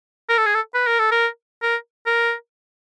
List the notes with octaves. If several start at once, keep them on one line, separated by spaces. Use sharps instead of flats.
A#4
A4
G#4
A4
B4
A#4
A4
A#4
A#4
A#4